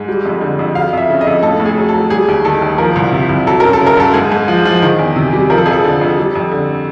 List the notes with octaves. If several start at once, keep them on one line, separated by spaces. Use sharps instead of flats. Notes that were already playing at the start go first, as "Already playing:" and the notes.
Already playing: G#2
G3
F2
D3
F2
F#3 F5
F2 E5
C#3
D#5
F2
A2 A4
A2
G#4
F#3
A4
F#3
G3 G#4
D#2
D#3 A4
D#2
F3 A#4
C2
C3
C2
F#3 A4
F#2 A#4
A4
C#3
A#4
F#2 A4
G#2 G#4
G#2
F3
F3
D#3
E2
C3
G3
F3 A#4
A4
F2 G#4
A4
D3
F2
G3
F2
D3